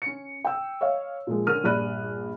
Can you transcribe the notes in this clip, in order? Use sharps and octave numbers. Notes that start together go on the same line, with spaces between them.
C#4 C#7
G5 E6
C#5 D#5 F5
A#2 F3 G#3
D3 C#4 A#4 F6 D#7
A#1 G2 D5 B5 F#6 D#7